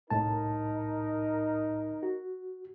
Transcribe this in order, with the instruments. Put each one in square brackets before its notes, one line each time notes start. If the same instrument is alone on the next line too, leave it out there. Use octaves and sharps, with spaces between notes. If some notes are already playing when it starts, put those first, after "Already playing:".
[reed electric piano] C2 A2 A5 [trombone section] D#4 A#4
[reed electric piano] F#4